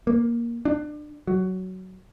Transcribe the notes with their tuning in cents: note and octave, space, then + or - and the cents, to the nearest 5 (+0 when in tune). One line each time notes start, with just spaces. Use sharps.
A#3 +10
D4 +25
F#3 +10